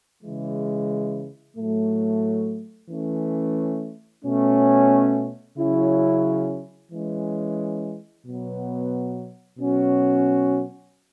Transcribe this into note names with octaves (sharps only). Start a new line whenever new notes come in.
C#3 E3 G#3
A2 F#3 A3
E3 A3 C#4
B2 A3 C#4
C#3 F#3 C#4 E4
E3 G#3 C#4
B2 F#3 B3
B2 F#3 C#4 F#4